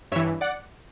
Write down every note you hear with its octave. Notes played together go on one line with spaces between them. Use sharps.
G2 E3 C#5 E5
D5 F#5